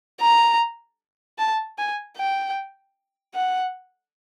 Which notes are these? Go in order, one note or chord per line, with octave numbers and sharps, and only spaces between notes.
A#5
A5
G#5
G5
F#5